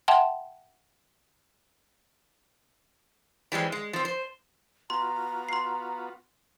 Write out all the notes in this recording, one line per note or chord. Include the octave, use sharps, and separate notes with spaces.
E5 F#5 G5 A5 C6
E3 G3 G#3 C4
G#3
F3 C4
C5
B3 F4 F#4 A#5 C6
C6 C7